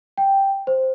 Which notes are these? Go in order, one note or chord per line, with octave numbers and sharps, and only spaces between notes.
G5
C5